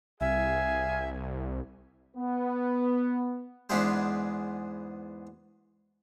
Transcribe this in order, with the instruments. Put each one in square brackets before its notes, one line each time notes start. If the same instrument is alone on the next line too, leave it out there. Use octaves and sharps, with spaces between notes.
[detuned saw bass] C2 [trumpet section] G#4 F5 G#5 [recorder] E5
[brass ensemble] B3
[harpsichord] E2 G#2 B3 D4 G#4 C5